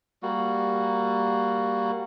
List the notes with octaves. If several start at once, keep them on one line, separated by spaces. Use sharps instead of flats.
G3 A#3 F#4